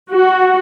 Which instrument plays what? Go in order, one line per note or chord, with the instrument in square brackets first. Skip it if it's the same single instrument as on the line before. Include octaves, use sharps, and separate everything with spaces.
[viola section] F#4